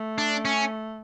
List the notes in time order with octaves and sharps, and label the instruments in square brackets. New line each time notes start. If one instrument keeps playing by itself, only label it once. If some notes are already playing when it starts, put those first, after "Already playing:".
Already playing: [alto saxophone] A3
[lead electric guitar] D4
C#4